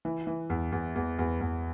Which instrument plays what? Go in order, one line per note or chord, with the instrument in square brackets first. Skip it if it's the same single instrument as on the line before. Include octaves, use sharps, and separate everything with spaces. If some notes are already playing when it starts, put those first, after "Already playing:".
[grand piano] E3
E3
E2
E2
E2
E2
E2